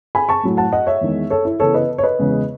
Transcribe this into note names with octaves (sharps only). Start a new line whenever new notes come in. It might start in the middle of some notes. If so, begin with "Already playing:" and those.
G#5 B5
A5 C#6
A2 F#3 A3
F#5 A5
D#5 F#5
C#5 E5
E2 D#3 G#3
A4 C#5
E4
C#3 E3 B3 A4 C#5
B4 D#5
C#5
B4 D#5
E2 C#3 G#3 C#4